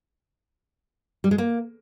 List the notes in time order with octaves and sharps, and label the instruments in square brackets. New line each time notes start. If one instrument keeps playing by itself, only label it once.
[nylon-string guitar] G3
G#3
A#3